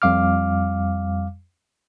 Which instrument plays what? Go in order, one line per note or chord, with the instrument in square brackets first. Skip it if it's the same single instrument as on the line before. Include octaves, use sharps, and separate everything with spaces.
[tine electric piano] F2 G3 F5 D6 F6